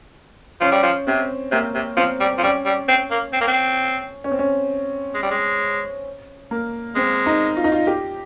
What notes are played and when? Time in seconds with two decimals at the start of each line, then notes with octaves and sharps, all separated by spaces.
0.61 F3 C#4
0.72 G3
0.83 F3
1.07 C3 C4
1.52 C3 A#3
1.75 C3
1.97 F3 C4
2.21 G3
2.38 F3
2.43 G3 C#4
2.66 G3
2.88 C4
3.11 A#3
3.33 C4
3.41 A#3
3.48 C4
4.24 C#4
4.31 C4
4.39 C#4
5.15 G#3
5.23 G3
5.31 G#3
6.51 A#3
6.96 G#3 C4
7.26 D#4
7.57 F4
7.64 D#4
7.72 F4
7.87 G4